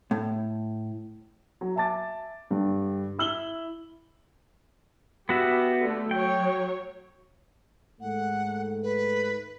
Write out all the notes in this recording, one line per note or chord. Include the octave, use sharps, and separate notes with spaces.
A2
F#3
E5 G#5 A5 D6 A6
G2 D3 G3
E4 E6 F#7 G7
B3 F#4 G4 E5
D3 A3
F#3 C#5 G5
G#2 D#3 A3 F#5
B4